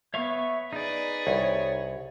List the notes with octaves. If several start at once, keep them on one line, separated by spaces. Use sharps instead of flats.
B3 C#5 E5 F5 C#6
D#4 G#4 B4 D5
C2 C#5